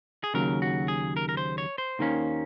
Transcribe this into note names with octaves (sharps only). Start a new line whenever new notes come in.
G#4
D#2 C#3 F#3 A#4
F#4
G#4
A#4
A#4
C5
C#5
C5
D#2 D#3 A#3 C#4